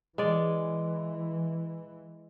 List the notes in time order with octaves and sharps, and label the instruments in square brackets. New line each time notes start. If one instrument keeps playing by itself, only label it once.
[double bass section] E3 [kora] G#3 D5